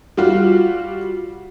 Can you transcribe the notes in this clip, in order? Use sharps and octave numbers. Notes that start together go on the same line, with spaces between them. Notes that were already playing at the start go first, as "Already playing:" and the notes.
G3 F4 F#4